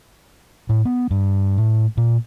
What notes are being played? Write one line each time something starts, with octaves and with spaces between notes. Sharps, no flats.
A2
B3
G2
A2
A#2